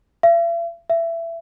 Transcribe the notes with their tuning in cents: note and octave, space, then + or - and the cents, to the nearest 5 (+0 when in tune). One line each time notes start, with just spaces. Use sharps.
E5 +45
E5 +20